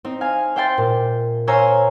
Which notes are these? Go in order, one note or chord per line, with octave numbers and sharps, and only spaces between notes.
C4 D#4
F5 G#5
C5 E5 G5 C6 A6
A#2
C5 C#5 F5 G#5 A#5 E6